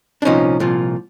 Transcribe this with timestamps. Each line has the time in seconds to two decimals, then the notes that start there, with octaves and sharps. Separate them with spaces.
0.22 D4
0.25 C2 A#2 F3 C#4 D#4
0.60 C2 A#2 F3